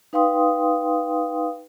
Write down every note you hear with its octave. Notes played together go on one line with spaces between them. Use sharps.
D#4 B4 F5 G5 C6 D#6